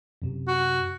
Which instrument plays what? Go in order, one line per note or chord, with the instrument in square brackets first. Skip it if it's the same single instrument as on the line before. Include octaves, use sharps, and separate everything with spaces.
[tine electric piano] F#2 C3
[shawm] F#4